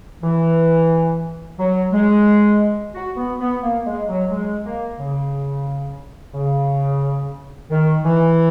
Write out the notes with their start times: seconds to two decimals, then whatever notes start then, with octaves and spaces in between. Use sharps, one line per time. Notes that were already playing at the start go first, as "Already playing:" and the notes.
0.23 E3
1.59 F#3
1.92 G#3
2.94 F#4
3.17 B3
3.40 B3
3.62 A#3
3.85 G#3
4.08 F#3
4.31 G#3
4.65 A#3
4.98 C#3
6.34 C#3
7.70 D#3
8.04 E3